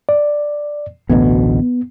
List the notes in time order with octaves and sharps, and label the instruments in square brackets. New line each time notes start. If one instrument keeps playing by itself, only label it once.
[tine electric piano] D5
[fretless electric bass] A1 D2 B2 [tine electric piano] B3